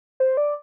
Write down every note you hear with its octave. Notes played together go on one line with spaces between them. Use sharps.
C5
D5